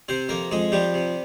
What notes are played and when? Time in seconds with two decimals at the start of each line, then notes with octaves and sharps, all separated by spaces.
0.09 C3 C4 C5
0.29 F2 A#3 A#4
0.51 F2 G#3 G#4
0.72 F3 G3 G4
0.94 C3